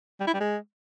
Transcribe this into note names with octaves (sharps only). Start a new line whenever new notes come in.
G3
E4
G3
G#3